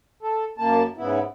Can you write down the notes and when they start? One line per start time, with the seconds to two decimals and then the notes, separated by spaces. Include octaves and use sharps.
0.23 A4
0.58 F#2 A#3 A5
0.97 G#2 C#3 B3 E4